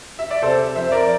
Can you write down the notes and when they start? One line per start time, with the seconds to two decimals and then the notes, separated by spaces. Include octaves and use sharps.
0.19 E5
0.31 D5
0.42 C3 A4 C5
0.75 F2 C5 E5
0.92 A#4 D5